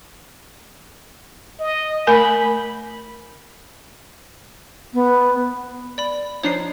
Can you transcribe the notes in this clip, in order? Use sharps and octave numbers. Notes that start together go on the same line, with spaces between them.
D#5
A3 A#4 G#5 B5
B3
D5 B5
F3 D4 D#4 C#5 C7